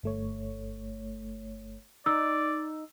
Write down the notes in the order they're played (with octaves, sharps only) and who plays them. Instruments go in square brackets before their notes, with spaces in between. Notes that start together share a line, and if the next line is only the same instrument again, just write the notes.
[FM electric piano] G1 A3 C#5
[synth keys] D#4 [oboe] D5 [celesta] E6